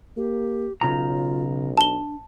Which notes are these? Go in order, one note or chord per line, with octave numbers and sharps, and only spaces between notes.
A#3 G4
B1 C#3 F4 A#5
D4 A5 G7